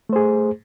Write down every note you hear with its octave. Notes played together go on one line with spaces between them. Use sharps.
A3 G#4 C5